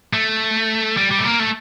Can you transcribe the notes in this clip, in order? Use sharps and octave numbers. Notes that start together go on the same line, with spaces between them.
A3
G3
G3
A3
A#3
A3